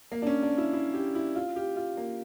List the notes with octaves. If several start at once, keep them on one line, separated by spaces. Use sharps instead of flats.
A#3
D4
C#4
D4
E4
E4
G4
E4
F4
G4
F4
A#3